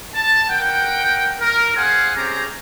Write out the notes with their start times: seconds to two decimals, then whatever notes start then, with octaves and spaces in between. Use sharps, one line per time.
0.14 A5
0.50 A#4 F#5 G5
1.40 A#4
1.76 G#4 C5 F5 F#5 G#5
2.15 C4 C#4 G4 G#4 A#5